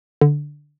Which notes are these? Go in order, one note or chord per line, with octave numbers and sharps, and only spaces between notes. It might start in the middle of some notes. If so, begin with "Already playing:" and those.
D3